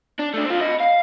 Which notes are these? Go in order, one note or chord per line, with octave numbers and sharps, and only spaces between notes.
D4
A3 D4
C4 F4
D#5 B5
F5